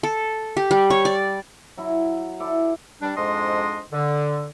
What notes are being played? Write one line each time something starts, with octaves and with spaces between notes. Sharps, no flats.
A4
G4
G3
C#5
D5
F#3 E4
E4 A4 D5
G3 D4
F2 G#2 G#3 D4 D#5 C6
D3